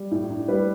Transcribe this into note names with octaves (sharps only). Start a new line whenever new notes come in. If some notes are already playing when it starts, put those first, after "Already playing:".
Already playing: G3
A2
D4
G3 B4